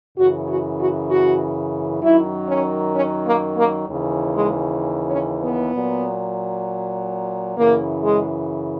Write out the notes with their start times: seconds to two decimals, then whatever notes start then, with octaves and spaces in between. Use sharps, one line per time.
0.18 F#2 C#3 E3 F#4
0.49 F#4
0.80 F#4
1.10 F#4
2.03 F#2 D#3 F#3 E4
2.49 C#4
2.95 C#4
3.26 A#3
3.57 A#3
3.88 D#2 C#3 E3
4.34 G#3
5.11 C#4
5.42 B3
5.73 A#2 F#3
7.57 F#2 C#3 E3 A#3
8.04 G#3